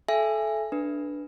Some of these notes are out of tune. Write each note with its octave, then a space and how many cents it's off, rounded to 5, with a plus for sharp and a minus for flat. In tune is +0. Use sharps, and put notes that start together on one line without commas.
A4 -25 E5 +20 G#5 -15
D4 +0 B4 +0